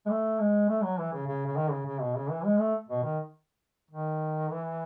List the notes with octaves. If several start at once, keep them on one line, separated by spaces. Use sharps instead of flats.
G#3
A3
G#3
A3
F#3
E3
C#3
C#3
C#3
D#3
C#3
C#3
B2
C#3
E3
G#3
A3
B2
D#3
D#3
E3